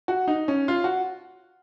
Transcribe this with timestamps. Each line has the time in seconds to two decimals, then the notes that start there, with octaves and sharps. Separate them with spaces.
0.08 F#4
0.28 D#4
0.48 C#4
0.68 F4
0.84 F#4